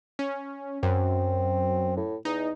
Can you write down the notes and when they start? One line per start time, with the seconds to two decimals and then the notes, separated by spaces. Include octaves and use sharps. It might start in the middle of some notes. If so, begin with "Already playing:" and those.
0.19 C#4
0.83 F#2 C4
1.97 A2
2.25 E2 D#4